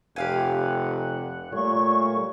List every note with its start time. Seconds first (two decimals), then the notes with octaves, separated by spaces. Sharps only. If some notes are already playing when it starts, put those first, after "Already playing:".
0.16 F1 G4 F5 F#5 G#5
1.53 A#2 G3 A3 C#5 C#6